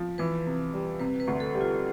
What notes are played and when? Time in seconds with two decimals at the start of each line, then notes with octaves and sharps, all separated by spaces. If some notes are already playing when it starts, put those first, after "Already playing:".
Already playing: F3
0.18 E3 B4
0.46 C3
0.74 G3
1.00 C3 B4
1.20 B4
1.28 D2
1.40 A4
1.55 G3
1.61 F4